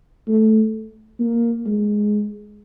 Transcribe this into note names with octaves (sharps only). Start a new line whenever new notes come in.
A3
A#3
G#3